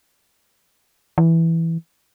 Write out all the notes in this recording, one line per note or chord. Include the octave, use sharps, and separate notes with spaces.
E3